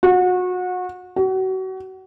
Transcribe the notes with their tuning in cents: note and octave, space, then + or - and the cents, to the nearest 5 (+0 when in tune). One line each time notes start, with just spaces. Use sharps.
F#4 -30
F#4 +30